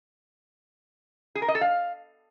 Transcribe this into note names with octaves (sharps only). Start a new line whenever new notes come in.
G#4
A#4
D#5
A4
F5